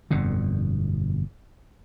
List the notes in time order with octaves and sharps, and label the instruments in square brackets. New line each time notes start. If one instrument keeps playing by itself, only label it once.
[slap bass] G1 F2 B2 D3